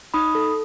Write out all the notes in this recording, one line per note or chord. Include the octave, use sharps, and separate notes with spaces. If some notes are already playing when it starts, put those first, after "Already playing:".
D#4 B5 D#6
A4